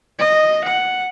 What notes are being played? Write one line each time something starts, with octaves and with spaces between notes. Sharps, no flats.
D#5
F#5